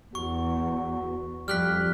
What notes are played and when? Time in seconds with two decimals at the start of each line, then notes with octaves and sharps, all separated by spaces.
0.15 E2 F#4 C#6
1.48 F2 G3 F6 F#6 B6